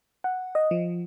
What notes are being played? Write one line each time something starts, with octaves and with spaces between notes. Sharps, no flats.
F#5
D#5
F3